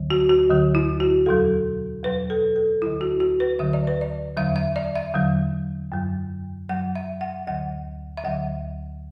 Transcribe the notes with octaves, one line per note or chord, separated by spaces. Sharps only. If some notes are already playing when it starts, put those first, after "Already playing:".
Already playing: D2 D3 F#3
F#4
F#4
D2 D3 F#3
E4
F#4
E2 B2 F#3 A4
E2 B2 F#3 B4
A4
A4
D2 D3 F#3 E4
F#4
F#4
B4
D2 D3 F#3 E5
D5
B4
D5
E2 D3 F#3 E5
E5
D5
E5
E2 D3 F#3
F#2 F#3
F#2 F#3 F#5
E5
F#5
D2 D3 F#3 F#5
E5
D2 D3 F#3 F#5